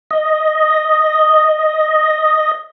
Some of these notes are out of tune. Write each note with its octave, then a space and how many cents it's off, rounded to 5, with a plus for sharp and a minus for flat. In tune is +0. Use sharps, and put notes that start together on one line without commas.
D#5 +0